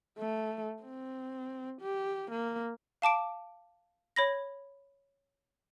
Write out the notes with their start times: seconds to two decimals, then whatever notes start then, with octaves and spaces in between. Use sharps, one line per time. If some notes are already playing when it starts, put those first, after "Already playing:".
0.18 A3
0.82 C4
1.81 G4
2.31 A#3
3.02 F5 A5 D6 D7
4.16 C#5 B5 A#6